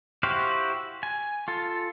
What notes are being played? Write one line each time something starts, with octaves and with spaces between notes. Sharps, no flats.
E4 F#4 G4 C5 F5
G#5
F4 A4